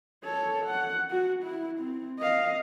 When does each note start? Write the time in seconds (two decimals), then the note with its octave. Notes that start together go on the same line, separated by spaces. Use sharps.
0.24 A4 C#5
0.66 F#5
1.11 F#4
1.43 E4
1.79 C4
2.19 D#5 F5